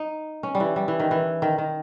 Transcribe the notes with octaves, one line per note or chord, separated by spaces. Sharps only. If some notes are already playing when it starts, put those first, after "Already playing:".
Already playing: D#4
C#4
G3
E3
G3
E3
D#3
E3
D#3
D#3